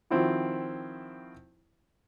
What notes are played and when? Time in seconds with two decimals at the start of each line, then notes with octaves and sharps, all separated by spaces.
0.10 D#3 F3 C4 E4 F#4